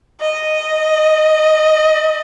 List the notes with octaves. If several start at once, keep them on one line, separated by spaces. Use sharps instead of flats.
D#5